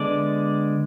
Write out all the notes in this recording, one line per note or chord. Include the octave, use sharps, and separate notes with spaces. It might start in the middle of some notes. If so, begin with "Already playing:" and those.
Already playing: D3 G#3 B3 D5